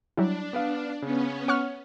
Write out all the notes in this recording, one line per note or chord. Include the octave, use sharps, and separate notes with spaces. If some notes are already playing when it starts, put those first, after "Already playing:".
F#3 G3 D4 E4
B3 B4 F5
C#3 B3 C#4
C#5 F#5 C#6 F6